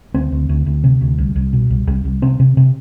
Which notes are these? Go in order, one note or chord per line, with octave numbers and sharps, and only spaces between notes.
D2 C4
D2
D2
D2
C3
D2
C2
C2
B2
C2
C2
C2
C3 C4
C3
C3